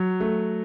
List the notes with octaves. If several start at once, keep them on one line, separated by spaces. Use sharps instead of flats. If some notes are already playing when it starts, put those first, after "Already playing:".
Already playing: F#3
A3